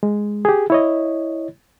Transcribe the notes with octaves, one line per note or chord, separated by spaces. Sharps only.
G#3
G4 G#4
E4 C#5 D#5